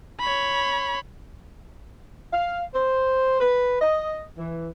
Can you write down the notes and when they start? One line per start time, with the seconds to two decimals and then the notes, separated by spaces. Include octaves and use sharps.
0.20 C#5 B5
2.33 F5
2.74 C5
3.40 B4
3.81 D#5
4.37 E3